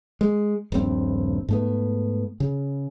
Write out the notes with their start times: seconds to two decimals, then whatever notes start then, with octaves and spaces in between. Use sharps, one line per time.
0.21 G#3
0.72 D#1 A#1 G2 C4
1.48 G#2 A3 B3
2.40 C#3